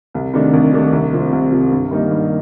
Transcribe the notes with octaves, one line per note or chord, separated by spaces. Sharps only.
C2
C3 D#3 A3 D4
C2
C3 D#3 A3 D4
C2
C3 F3 C4
C2
C3 F3 C4
G2
D#3 G3 A#3 D#4
G2